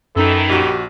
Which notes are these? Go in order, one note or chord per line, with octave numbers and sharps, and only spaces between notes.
F#2 D#3 E3 D#4 A4
A#1 F#4 G4